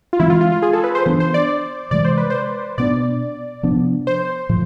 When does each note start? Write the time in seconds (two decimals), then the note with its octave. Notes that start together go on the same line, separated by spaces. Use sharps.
0.13 F4
0.20 E3 G#3 C4 E4
0.30 F4
0.41 F4
0.52 F4
0.62 G#4
0.73 A4
0.84 B4
0.95 C5
1.06 E3 B3 D4 C5
1.20 C5
1.34 D5
1.91 C3 E3 G#3 D5
2.05 C5
2.17 B4
2.30 C5
2.78 B2 B3 D4 D5
3.63 C3 F3 B3 D4
4.07 C5
4.49 A2 F3